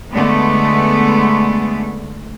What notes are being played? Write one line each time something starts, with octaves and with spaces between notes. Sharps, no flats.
D3 G#3 A3 B3